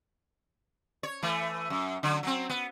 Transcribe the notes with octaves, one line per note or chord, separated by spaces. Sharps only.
C#5
E3 A3
F#2
D3 F#3
F#3 C4
B3